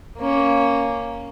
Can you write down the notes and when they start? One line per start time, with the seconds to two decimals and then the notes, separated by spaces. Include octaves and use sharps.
0.18 A#3 C#4